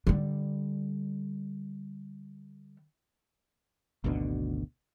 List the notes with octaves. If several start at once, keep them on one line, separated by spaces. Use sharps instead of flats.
D3 G3
G#1 D2 B2 D3